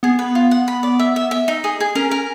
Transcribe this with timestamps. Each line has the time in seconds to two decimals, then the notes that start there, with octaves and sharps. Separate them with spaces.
0.03 B3 G#4
0.19 B4
0.35 F4
0.51 F#5
0.68 B5
0.83 D5
0.99 E5
1.16 E5
1.31 E5
1.48 D#4
1.64 G#4
1.80 G#4
1.95 C#4 A#4
2.11 A#4